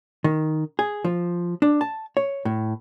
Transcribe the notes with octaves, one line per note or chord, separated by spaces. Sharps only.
D#3
G#4
F3
D4
A5
C#5
A2